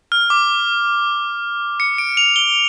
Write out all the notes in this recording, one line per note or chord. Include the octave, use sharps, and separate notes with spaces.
F6
D6
C#7
D7
F7
G7